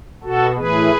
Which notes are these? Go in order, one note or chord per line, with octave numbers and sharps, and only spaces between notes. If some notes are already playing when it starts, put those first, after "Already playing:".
B2 F#4 A4
A2 E3 G#4 B4